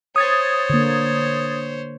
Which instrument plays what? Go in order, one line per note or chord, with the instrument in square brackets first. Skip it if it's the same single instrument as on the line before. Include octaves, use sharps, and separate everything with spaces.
[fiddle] C5 C#5 [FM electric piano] D#6 G#6 A6
[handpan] D3 A#3